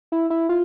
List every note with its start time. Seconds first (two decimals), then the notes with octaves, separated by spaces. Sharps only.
0.12 E4
0.30 E4
0.49 F4